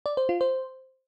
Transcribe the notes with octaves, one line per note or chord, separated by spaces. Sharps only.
D5
C5
F4
C5